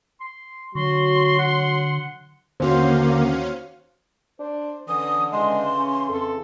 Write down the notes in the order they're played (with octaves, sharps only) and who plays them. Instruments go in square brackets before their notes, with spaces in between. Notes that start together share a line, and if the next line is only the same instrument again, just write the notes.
[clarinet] C6
[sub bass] D3 [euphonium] F#3 [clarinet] F#4 [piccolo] C6
[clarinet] F#5
[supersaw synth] D#2 C#4 F5 [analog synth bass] D3 [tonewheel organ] A#3 [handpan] F#4 C5
[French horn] D4 [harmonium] C5
[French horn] D3 [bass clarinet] E3 [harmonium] C#4 [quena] D#6
[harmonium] C#3 E3 [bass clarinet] G#3 [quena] C6
[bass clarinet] C#4
[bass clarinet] F2 [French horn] A4